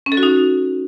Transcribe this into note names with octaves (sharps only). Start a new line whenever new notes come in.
C#4
A4
F#4
D#4